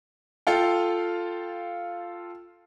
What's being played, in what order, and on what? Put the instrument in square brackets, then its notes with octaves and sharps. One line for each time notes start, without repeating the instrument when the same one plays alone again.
[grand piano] F4 A4 F5 G5